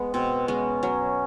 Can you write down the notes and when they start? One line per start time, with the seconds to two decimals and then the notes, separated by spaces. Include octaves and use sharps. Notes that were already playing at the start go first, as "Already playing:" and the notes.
Already playing: G#3 B3
0.13 B2 C4
0.48 G#3 B3 C#4
0.83 F#3